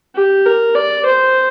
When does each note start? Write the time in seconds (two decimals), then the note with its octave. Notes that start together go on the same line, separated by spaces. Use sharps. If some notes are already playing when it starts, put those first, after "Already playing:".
0.15 G4
0.45 A#4
0.75 D5
1.05 C5